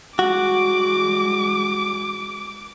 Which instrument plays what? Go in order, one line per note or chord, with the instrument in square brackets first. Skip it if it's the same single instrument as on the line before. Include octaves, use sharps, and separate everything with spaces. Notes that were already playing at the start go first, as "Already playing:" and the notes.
[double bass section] E3 G3 G#3 [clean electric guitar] F#4 [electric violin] D6